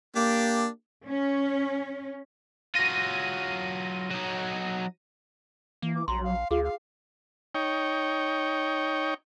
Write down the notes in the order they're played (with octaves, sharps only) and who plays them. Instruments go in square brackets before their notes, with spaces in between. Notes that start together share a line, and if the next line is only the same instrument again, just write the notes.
[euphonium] A#3 [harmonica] D4 G4
[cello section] C#4
[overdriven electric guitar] F#3 F4 [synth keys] A#6 D#7
[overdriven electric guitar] F#3 D#4
[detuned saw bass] E3 [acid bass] A#3
[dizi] D6
[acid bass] A#1 [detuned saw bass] F#3 [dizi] A#5 [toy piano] C6
[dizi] F5
[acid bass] D2 [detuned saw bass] F4 [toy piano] G#4 [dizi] F5
[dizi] F5
[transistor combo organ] D#4 C#5 G5